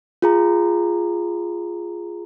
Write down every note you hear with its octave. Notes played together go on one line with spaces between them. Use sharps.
F4 G#4 A#5